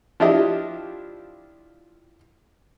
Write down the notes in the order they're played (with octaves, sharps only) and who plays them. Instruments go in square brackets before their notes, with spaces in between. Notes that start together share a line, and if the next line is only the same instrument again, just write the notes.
[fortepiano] F3 D4 E4 G4 D#5